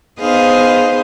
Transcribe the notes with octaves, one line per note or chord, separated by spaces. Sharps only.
B3 D#4 G#4 C5 F5 D#6